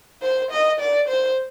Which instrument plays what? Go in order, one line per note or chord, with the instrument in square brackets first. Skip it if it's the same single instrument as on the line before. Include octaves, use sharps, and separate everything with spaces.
[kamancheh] C5
D#5
D5
C5